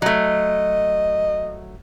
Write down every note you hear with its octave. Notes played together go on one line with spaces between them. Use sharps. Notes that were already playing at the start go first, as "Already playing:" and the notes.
F#3 A3 D#5